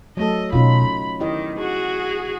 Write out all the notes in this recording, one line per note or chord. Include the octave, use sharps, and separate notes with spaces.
F#3 A3 A4 D#5
B2 D3 C#4 D#4 F4 B5
C#3
D#3 E4 G4 D#5
F#4 G#4